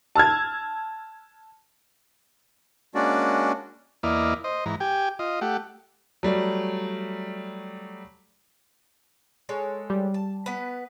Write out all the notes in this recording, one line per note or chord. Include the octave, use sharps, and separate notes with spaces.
A5 E6 F6 G#6
G#3 A#3 C#4 D4 F#4 D5
E2 A#3 E4 D5 D#5 F6
C5 D#5
G#2 E3 A#5
G4 G5 G#5
F4 D#5
A3 G4 F#5
F#3 G3 A3
G#3 A4 C#5
G3
A5
B3 B4